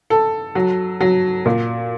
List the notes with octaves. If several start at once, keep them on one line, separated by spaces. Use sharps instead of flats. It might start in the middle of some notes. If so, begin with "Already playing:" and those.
A4
F#3
F#3
A#2